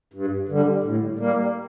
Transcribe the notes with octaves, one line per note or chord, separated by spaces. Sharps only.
G2
D3 G3
A2
G3 A#3